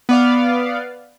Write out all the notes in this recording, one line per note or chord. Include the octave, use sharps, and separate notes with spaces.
B3 D5 F5